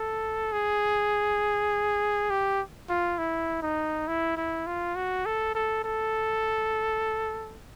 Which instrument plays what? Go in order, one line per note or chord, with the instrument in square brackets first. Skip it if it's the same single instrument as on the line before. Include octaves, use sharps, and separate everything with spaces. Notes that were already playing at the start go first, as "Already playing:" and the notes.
Already playing: [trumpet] A4
G#4
G4
F4
E4
D#4
E4
E4
F4
F#4
A4
A4
A4